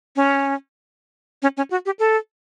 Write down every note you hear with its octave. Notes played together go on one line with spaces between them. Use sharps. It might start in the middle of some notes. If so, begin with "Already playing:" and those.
C#4
C#4
C#4
F#4
G4
A4